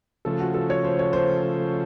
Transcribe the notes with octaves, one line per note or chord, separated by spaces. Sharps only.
C#3 F3 A3 A4
F#4
A4
C#5
C5
C#5
C5